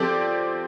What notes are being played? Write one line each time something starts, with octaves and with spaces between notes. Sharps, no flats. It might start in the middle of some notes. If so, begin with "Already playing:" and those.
Already playing: F3 C4 G4 A4 D5